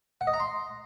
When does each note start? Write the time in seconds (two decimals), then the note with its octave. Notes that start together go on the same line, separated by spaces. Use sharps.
0.21 F#5
0.27 D#5
0.34 A#5
0.40 C6